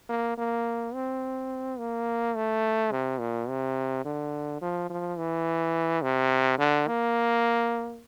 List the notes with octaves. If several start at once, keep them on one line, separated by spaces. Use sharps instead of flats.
A#3
A#3
C4
A#3
A3
C3
A#2
C3
D3
F3
F3
E3
C3
D3
A#3